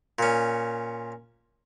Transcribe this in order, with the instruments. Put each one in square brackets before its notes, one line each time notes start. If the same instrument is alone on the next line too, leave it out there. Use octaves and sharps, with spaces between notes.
[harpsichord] A#2 C#4